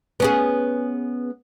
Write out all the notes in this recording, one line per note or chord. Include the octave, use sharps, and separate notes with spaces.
B3 C#4 G#4